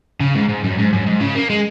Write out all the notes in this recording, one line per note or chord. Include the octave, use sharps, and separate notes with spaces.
C#3
G#2
G#2
F#2
G#2
F#2
G#2
C#3
A#3
G#3